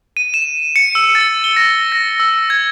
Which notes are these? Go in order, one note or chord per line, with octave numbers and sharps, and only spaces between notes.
D#7
E7
C#7
E6
A6
G7
A#6
A#6
E6
G#6